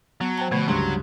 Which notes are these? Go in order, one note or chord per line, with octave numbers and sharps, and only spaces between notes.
F#3 B3
C5 G5 A5
B2 D3 F3 A3
C#2 G2 F#3 C6